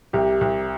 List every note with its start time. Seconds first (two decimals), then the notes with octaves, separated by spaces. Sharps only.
0.13 C2 G4
0.41 C2